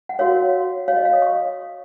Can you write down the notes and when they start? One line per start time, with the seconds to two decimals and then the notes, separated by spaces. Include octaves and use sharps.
0.09 F#5
0.19 F#4 A#4 C#5 F5
0.88 F#4 C#5 F5
0.96 D#5
1.05 F5
1.13 D#6
1.22 C#6